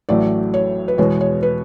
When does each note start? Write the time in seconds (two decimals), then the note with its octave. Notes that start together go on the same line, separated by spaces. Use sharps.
0.09 A1 A2 F#3 A3 D5
0.54 C#5
0.88 B4
0.98 E2 B2 G#3 C#5
1.21 C#5
1.43 B4